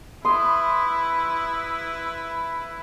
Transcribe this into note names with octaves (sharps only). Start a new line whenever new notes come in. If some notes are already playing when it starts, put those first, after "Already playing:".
E4 B4 C6 D#6